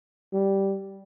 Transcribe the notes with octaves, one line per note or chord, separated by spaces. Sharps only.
G3